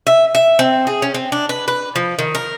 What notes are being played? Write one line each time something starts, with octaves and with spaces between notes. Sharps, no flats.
E5
E5
C4
G#4
C#4
C4
D4
B4
B4
F3
D#3
A#4